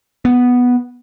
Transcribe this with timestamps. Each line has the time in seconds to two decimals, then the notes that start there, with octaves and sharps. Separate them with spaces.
0.25 B3